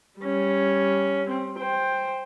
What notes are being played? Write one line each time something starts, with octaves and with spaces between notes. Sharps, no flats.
G3 C#4
C4
C5 G5